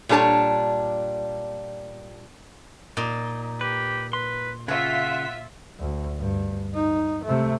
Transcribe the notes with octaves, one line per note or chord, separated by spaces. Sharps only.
A#2 G3 D4 A4 C#5 A5
A#2 D#4
G4 B4
B4 C6
C#3 F4 C#5 E5 F#5 B6
D2
G2
D#4
C3 A3